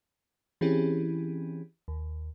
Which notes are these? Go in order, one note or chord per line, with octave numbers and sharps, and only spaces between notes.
E3 C4 C#4 E4 G4 G#4
D#2